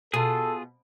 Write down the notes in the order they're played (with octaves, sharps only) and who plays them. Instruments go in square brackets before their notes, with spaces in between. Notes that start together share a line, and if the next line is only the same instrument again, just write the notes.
[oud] B2 [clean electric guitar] F4 G#4 [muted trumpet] A4